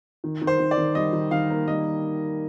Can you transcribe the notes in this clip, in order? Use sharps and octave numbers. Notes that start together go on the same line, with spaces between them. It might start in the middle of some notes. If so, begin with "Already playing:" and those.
D#3
D#3
C5
D#3
D5
D#3
G3 D#5
D#3
D#3 F5
A#3
G3 D#5